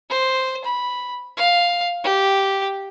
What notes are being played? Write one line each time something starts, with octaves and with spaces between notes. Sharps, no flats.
C5
B5
F5
G4